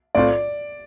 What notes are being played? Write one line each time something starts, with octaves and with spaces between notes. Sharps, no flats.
A2 A3 C4 F4 D5